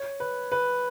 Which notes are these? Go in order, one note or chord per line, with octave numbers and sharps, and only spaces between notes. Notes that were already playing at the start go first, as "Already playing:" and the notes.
Already playing: C#5
B4
B4